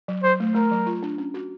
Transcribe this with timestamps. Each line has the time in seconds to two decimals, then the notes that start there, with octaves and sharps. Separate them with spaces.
0.08 F#3
0.23 F#3 C5
0.40 A3
0.55 A3 A#4
0.71 F#3
0.87 F4
1.03 D4
1.18 C#4
1.34 F#4